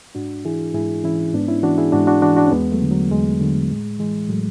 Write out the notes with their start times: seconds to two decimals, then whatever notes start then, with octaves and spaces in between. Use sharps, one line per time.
0.15 G#2 D4 F#4
0.45 E3 E4 G#4
0.74 G#2 E4 G#4
1.04 E3 C#4 E4
1.34 G#2 B3 D4
1.48 C#4 E4
1.63 E3 D4 F#4
1.78 E4 G#4
1.92 G#2 D4 F#4
2.07 D4 F#4
2.22 E3 D4 F#4
2.36 D4 F#4
2.46 C#4
2.52 E2 G#3 B3
2.72 F#3 A3
2.82 D3
2.91 F#3
3.11 E2 G#3
3.41 D3 F#3
3.70 A2 G#3
3.99 E3 G#3
4.29 A2 F#3 A3